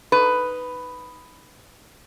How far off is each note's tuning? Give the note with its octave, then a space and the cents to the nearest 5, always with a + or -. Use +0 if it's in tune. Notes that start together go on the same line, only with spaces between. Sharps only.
D#4 +0 B4 +10